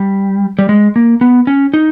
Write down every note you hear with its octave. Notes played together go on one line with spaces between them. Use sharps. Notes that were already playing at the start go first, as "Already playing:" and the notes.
Already playing: G3
G3
G#3
A#3
B3
C#4
D#4